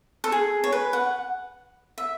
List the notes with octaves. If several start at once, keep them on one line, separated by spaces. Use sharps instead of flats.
A4
G#4
C#5
B4
F#5
E5